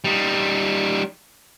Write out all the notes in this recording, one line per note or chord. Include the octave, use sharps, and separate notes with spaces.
G3 D#4